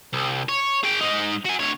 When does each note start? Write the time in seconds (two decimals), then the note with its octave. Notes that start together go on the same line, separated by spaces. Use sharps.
0.13 C2
0.49 C#5
0.84 G#4 G5
1.01 G#2 D#4
1.45 F#4 G#5
1.59 D2 C#5